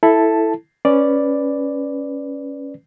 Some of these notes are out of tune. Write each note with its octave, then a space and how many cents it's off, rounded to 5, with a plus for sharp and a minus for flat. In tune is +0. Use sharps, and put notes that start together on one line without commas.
E4 +0 A4 +0 A5 +0
C#4 +0 B4 +0 D5 +0